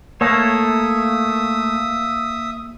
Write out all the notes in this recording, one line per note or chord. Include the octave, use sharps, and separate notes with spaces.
A3 A#3 A4 C#5 E5 D#6